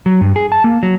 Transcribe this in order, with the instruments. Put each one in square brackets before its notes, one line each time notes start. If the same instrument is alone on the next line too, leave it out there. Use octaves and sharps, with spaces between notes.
[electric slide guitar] F#3
G2
G#4
A5
A#3
F#3